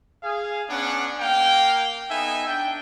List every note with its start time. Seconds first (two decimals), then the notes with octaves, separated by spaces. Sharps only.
0.22 G#4 F5
0.69 B3 C#4 D4 F#5
1.18 A#3 F5 G5
2.09 B3 D#4 A4 E5 G#5
2.46 D4 G5